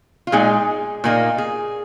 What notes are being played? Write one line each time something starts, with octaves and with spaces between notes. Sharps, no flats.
F4
A#2 G#3 D#4 G#4
A#2 A#3 D#4
G#4